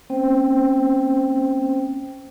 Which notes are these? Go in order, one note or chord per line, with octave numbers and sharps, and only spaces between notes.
A#3 C4 C#4 C5 G5